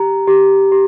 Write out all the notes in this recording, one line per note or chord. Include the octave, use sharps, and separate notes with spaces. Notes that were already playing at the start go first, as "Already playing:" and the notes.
Already playing: G4 A#5
G4
G4